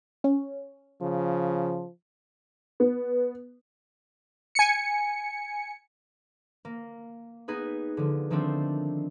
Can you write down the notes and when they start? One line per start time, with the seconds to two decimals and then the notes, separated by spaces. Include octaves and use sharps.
0.24 C#4
1.01 C#3 F3
2.80 B3
4.55 G#5 C#7
6.65 A#3
7.48 B3 D#4 G#4 B4
7.97 D3 F3
8.30 D#3 F3 A3 C4 D4